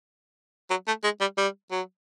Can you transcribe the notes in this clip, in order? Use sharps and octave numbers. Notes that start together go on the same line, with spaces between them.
F#3
A3
G#3
G3
G3
F#3